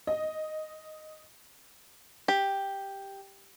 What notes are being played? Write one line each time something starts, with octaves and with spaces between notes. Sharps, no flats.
D#5
G4